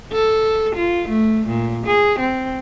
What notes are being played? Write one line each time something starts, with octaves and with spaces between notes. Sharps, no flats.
A4
F4
A3
A#2
G#4
C4